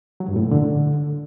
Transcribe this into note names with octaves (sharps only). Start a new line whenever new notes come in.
F#3
G2
A2
A#2
D3